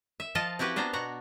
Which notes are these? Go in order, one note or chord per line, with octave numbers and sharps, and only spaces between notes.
E5
F3 F4 D#5 F5 A5
C4 E4 F#4 G4 B4
B3 D4 C5 F5 A#5
B2 F#4 F#5 A#5